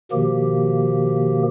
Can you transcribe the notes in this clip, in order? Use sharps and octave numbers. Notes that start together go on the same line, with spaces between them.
B2 D#3 F3 A#3 G4